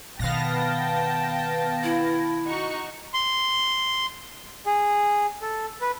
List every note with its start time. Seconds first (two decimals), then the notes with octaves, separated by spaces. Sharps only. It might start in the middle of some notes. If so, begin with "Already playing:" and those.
0.19 B2 D#3 B3 F5 G5 A5 A#6
1.84 E4
2.46 D#4 F#4 C#6
3.14 C6
4.66 G#4
5.42 A4
5.81 B4